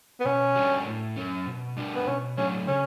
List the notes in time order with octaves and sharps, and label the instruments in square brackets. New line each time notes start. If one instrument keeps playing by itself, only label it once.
[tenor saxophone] B3
[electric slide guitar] B2 [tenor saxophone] C#4
[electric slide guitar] G3 D4 F#4
A2
F#3 C#4
B2
G3 D4 F#4
[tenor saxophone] B3
[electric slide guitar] B2 [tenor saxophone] C#4
[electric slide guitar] F#3 A3 D4 F#4 [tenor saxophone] C#4
[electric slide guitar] C#3 [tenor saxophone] C#4